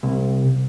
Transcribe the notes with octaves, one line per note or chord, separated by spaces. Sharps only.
C2